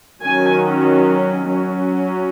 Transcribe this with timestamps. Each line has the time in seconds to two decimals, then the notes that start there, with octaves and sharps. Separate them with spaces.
0.24 D#3 F#3 C#4 G#5
1.47 F#3 C#4